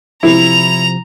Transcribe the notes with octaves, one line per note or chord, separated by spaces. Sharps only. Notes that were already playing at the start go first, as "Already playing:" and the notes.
C3 F3 E4 A#5 F7